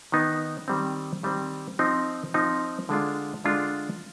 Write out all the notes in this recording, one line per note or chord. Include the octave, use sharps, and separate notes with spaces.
D#3 B3 D#4
D#3 G3 C4
D#3 G3 C4
F3 C4 D#4
F3 C4 D#4
D3 G#3 D4 F4
D3 G#3 D4 F4